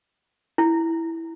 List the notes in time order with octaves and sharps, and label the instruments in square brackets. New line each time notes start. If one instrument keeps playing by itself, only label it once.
[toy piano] E4